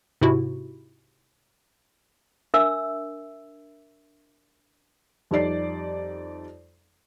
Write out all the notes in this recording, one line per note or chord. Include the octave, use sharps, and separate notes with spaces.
G#2 C3 E4 F#4
D4 A#4 E5 E6
F2 G3 D#4 D5 C7